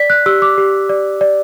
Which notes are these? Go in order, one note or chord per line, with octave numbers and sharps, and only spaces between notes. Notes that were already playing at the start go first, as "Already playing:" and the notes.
Already playing: D5 B6
F#6
G4 E6
D6
G4
D5
D5